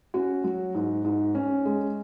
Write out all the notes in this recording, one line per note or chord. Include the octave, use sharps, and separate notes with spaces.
C#4 F#4
F#3
G#2
G#2
C#4
G#3